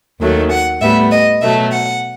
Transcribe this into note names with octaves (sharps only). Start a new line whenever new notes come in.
D#2 D#3 F#3 A3
F#5
A2 G3 B3 E5
D#5
B2 F#3 A3 E5
F#5